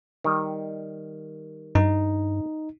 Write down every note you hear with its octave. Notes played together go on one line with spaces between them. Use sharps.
D#3 G3
G2 D#4